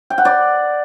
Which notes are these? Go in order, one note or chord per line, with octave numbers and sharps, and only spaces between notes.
G5
F#5
D5